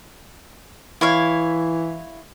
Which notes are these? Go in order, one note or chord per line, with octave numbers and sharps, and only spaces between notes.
E3 E4 C#5 F5